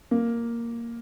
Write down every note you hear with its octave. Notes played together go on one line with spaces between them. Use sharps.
A#3